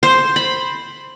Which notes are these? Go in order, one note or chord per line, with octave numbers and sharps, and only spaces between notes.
C5
B5